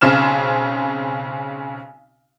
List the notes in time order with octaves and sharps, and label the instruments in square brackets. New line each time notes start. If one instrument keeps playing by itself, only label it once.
[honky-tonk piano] B1 C#3 C4 F6 E7